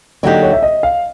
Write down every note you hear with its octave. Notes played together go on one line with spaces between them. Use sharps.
D3 F#3 A#3 D#4 G4 C#5
C#5
E5
D#5
F5